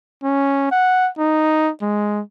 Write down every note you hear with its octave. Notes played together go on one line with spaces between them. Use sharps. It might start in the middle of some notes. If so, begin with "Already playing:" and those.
C#4
F#5
D#4
G#3